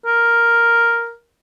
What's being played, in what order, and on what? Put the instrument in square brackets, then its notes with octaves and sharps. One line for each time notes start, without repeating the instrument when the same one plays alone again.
[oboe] A#4